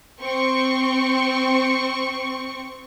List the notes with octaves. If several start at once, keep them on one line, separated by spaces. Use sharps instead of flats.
C4 C#6